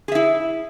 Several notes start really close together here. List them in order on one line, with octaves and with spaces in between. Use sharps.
G#4 E5 E4